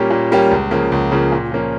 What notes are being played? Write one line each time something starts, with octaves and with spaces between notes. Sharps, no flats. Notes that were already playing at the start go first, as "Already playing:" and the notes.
Already playing: A#2 G3 A#3 C#4 G4
A#2
G3 A#3 C#4 G4
C#2
C#3 F3 A#3
C#2
C#3 F3 A#3
A#2
F3 A#3 C#4